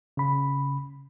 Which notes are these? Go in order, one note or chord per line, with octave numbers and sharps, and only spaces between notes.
C#3 B5